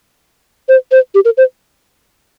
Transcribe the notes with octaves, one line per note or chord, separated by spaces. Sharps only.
C5
C5
G4
A#4
C5